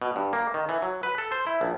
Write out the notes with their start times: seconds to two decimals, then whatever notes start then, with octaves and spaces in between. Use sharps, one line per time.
0.02 B2
0.16 G2
0.33 A#3
0.54 D#3
0.69 E3
0.82 F#3
1.03 B4
1.18 A4
1.32 C5
1.47 E4
1.61 A#1